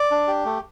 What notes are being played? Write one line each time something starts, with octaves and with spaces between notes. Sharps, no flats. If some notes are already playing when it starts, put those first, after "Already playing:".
Already playing: D5
D4
G4
A3